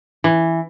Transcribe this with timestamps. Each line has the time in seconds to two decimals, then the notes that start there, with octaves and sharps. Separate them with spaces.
0.24 E3